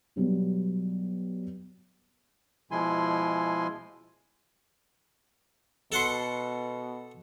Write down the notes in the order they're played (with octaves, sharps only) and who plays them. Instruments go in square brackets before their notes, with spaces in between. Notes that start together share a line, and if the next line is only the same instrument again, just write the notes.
[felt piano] B2 F#3 G3 B3
[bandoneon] B2 F3 G#3 E4 G#5 C6
[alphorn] B2 [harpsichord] A4 F#5 C6